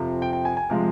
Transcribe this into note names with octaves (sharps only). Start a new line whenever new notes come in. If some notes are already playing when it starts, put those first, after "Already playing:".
Already playing: F2 C3 F3
G5
G5
G#5
G#5
C3 F3 G#3 F5